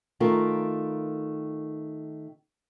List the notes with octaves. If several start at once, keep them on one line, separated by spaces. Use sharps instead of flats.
D#3 A3 F4 A#4